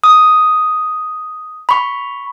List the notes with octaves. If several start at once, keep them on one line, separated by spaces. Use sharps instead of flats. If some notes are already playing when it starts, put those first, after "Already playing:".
D#6
B5 C#6